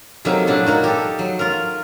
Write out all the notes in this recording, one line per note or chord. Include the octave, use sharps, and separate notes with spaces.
C3 F#3 A3 A#3 D#4 E5
A#2 F#3 D4 E4
A#3 D#4 F#4
G4 A4
F#3
F4 A#4